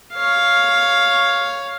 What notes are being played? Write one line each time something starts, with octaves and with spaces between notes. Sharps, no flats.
C#5 F5